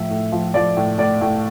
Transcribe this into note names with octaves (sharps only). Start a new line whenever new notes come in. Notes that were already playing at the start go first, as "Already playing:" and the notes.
Already playing: A2 F3 E5
A2
F3
F3 D5
A2
A2 D5
A2